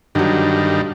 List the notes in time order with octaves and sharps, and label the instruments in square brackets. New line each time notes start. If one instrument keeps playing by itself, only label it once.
[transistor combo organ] G2 D#3 [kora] D3 F#3